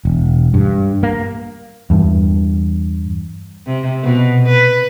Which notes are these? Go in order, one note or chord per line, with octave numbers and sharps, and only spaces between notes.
E1
G2
A#3
E2 G2
C3
B2
B4